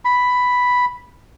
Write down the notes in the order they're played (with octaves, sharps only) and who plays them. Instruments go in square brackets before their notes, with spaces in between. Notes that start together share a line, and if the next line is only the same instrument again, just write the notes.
[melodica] B5